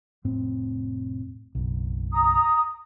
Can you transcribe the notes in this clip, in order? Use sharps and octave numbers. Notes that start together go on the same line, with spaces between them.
F1 A2 C4
F#1 B1
A#5 D#6